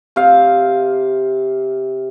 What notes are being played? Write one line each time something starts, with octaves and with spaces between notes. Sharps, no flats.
C3 F5